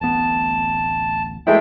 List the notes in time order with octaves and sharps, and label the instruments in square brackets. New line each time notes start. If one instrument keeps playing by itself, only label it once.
[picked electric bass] D1 A1 B3 [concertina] A5
[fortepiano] G#3 A3 E4 [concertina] G5